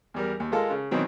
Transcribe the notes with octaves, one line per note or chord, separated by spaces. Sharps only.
E2 G3 A#4
D#2
G#3 F4 A4 A#4
C#3
B2 D#3 E3 F#3 C4